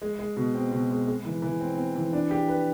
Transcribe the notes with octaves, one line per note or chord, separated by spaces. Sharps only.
G#3
G#3
B2
C4
B2
G#3
G#3
E3
E3
C4
C4
E3
D4
G4
B4